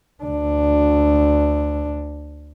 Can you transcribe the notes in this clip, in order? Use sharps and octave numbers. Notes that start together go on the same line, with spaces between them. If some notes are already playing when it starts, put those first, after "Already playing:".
D2 D4